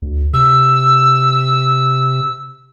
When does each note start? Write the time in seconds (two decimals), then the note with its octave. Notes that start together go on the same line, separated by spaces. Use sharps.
0.02 D2
0.33 C3 E6